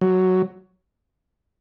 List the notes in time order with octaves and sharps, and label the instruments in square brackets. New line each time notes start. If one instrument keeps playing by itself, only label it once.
[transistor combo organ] F#3